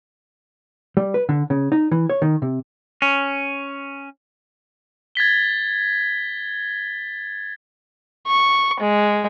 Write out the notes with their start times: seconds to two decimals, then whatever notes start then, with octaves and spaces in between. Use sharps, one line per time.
0.97 G3
1.14 B4
1.29 D3
1.50 C#3
1.72 D#4
1.91 E3
2.09 C#5
2.22 D#3
2.42 C3
3.02 C#4
5.15 G#6 A6 B6 G7
8.27 C#6
8.80 G#3